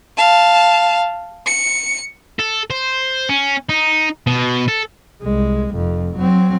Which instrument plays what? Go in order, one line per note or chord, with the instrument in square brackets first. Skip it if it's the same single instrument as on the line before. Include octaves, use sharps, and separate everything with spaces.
[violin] F5 A5
C#7
[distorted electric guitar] A4
C5
C#4
D#4
B2
A4
[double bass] C2 G#3
F1 F2
F#3 C4